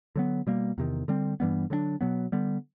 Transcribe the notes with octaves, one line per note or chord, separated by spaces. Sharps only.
D3 F#3 B3
B2 G3 A#3
E2 C3 D#3
D3 G3 C4
G2 E3 G3 B3
D3 F#3 B3 D4
B2 F#3 B3
D3 G3 B3